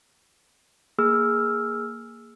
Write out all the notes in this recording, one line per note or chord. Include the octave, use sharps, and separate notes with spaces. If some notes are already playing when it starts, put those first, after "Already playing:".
A#3 G#4 E6 F6